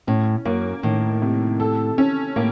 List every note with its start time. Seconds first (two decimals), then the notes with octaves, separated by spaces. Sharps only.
0.07 A2 C#4
0.45 F#2 A#3
0.83 A2 D#3
1.22 C3
1.60 A4
1.98 C#4
2.36 A2 A#3